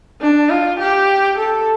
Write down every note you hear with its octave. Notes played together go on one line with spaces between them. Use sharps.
D4
F4
G4
A4